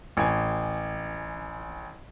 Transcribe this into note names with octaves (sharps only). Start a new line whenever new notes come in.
A1 G#5